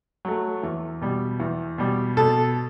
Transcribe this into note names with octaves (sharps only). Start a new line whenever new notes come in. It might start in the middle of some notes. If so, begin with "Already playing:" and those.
F#3 A3
E2
B2 G3
E2
B2 G3
B2 A4